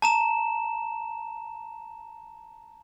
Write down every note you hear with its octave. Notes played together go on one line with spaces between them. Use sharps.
A5 A#5 E7